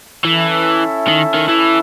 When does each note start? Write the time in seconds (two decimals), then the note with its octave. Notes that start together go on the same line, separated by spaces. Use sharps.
0.25 E3 C#4 E4 A4 E5
1.07 D#3
1.34 D#3
1.49 E3